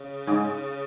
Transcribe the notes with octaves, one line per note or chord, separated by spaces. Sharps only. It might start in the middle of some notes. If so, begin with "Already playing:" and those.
Already playing: C#3
G#2